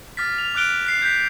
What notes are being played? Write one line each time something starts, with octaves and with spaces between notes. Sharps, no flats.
D6 F6 A6 B6
F7
D6 F6 F#6 D7 G7
F#6 B6 C7
G6 B6